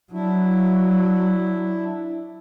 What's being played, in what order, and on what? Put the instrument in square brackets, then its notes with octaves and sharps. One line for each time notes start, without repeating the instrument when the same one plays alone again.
[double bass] F#3 [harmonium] D4 E4